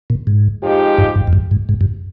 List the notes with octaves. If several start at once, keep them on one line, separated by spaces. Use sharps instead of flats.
A#2
G#2
F3 G#3 D#4 G4
G2
G2
F2
G2
G#2
G#2
G2